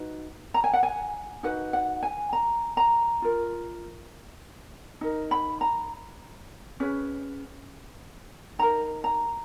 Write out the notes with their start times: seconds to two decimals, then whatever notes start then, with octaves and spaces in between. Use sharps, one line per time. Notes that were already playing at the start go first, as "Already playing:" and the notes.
Already playing: D#4 F#4 B4
0.54 A#5
0.64 G#5
0.73 F#5
0.83 G#5
1.43 D#4 F#4 B4 F#5
1.73 F#5
2.03 G#5
2.33 A#5
2.77 A#5
3.22 F4 A#4
5.01 D#4 A#4
5.31 B5
5.61 A#5
6.80 C#4 G#4 B4
8.59 D#4 A#4 A#5
9.04 A#5